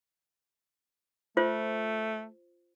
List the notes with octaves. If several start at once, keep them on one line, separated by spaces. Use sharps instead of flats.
A3 F4 C5